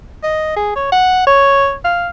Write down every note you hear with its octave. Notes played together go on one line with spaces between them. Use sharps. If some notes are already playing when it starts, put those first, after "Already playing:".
D#5
G#4
C#5
F#5
C#5
F5